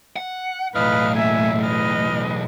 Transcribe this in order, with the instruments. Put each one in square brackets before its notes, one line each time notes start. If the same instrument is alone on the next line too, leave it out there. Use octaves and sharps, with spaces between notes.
[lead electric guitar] F#5
[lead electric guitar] B1 E2 [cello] A2 [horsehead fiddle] B4 [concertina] D#5 F5 F6
[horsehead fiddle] A#3 E5 [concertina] G#5
[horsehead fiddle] B4 D#5 [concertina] F6